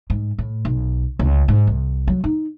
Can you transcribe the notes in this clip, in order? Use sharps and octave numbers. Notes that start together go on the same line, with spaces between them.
G#2
A2
B1
C#2
G#2
C2
F#3
D#4